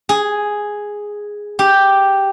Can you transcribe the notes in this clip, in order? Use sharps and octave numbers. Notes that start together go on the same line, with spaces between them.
G#4
G4